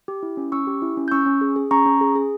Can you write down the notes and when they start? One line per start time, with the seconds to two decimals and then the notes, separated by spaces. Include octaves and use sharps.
0.08 G4
0.23 E4
0.37 C#4
0.52 C#4 C#6 E6
0.67 G4
0.82 E4
0.97 C#4
1.08 G6
1.12 C#4 C#6 E6
1.26 C#4
1.41 G#4
1.56 G#4
1.71 C#4 A#5 C#6
1.86 C#4
2.01 G#4
2.15 G#4